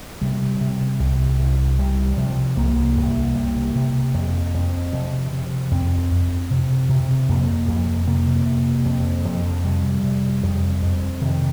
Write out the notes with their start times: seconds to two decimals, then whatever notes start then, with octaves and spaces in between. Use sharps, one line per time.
0.21 C3 G3
0.61 C3
1.00 C2
1.39 C2
1.79 C3 G3
2.18 C3 F3
2.57 C2 A#3
2.97 C2
3.36 C3
3.75 C3
4.14 F2
4.54 F2
4.93 C3 F3
5.33 C3
5.71 F2 C4
6.10 F2
6.50 C3
6.89 C3
7.29 F2 A#3
7.68 F2
8.07 C3 A#3
8.46 C3
8.85 F2
9.25 F2
9.64 C3 G3
10.04 C3
10.43 F2
10.82 F2
11.22 C3 D#3